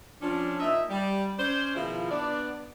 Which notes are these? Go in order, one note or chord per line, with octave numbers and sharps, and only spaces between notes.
F3 C#4 D4
A#2 D#4 D#5 E5
G3
C#4 C5 D5
B2 D#3 F3 E4 F4 G#4
B3 D4 D5